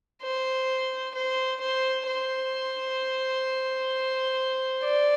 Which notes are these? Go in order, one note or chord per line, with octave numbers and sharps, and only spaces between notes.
C5
C5
C5
C5
D5